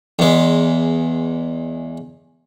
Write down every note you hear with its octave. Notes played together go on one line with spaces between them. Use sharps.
E2 G#3